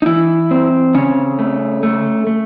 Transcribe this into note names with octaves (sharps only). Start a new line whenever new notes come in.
D#4
E3 E4
C4
C#3 C#4
A3
A3
A3